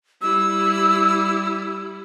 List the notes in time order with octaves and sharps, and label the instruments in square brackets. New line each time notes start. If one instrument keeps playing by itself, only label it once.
[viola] G3 E4 [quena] E6